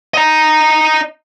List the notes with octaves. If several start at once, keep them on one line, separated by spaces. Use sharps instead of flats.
D#5 A#5